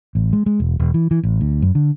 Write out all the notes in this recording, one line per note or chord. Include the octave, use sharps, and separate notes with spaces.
A1
G#3
G#3
E1
E1
E3
E3
A1
D2
F#2
D3